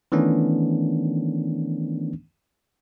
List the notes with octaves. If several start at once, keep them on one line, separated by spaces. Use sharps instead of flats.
D#3 E3 A3 B3 C#4 D4